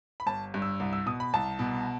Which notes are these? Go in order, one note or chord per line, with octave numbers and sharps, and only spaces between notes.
B5
G1 A5
G2
E6
C2
E6
B2 D#6
B5
C2 A5
B2